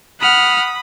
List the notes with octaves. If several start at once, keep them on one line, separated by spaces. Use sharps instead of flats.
F#5 B5 D#6 F6